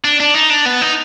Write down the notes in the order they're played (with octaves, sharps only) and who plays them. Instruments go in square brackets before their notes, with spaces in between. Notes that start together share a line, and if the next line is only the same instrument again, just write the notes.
[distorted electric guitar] D4
D4
D#4
D4
B3
D#4